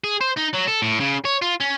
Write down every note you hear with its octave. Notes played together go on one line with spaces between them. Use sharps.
G#4
C5
D#4
F#3
A4
A2
C#3
C#5
F4
C#4